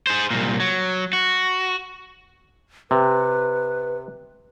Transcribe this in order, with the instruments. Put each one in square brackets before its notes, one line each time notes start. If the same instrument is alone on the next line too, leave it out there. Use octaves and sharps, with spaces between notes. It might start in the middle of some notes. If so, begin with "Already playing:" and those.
[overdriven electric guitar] G#4 C5
C2 A#2
F#3
F#4
[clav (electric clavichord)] C3 [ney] B4